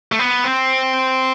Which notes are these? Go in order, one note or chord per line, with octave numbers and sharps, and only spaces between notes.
A3
B3
C4